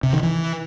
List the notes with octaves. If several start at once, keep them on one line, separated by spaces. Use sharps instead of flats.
C3
D#3
E3